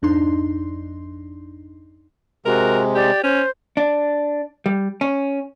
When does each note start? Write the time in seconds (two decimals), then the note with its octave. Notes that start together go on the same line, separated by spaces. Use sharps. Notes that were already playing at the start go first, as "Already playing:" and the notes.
0.02 G#1 F2 D4 D#4 C6
2.46 C3 G#3 F#4 A#4
2.95 G4 D5
3.24 C#4 C5
3.77 D4
4.66 G3
5.01 C#4